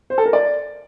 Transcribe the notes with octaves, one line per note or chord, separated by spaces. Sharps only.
C5
A4
A#4
D5